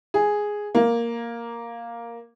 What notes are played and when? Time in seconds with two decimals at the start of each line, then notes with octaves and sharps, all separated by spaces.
0.14 G#4
0.75 A#3